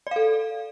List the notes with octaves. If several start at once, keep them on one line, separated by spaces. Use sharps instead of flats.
A4 D5 F5